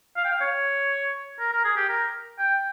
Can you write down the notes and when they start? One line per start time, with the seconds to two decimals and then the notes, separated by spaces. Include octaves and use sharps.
0.17 F5
0.25 G5
0.32 F5
0.41 C#5
1.40 A#4
1.52 A#4
1.65 G#4
1.77 G4
1.89 A#4
2.39 G5